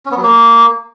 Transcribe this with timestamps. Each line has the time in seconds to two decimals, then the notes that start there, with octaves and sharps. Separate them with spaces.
0.06 C#4
0.11 B3
0.17 F#3
0.23 A#3